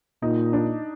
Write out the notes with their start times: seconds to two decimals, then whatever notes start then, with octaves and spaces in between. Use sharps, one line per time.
0.22 A#2 D#4
0.53 D4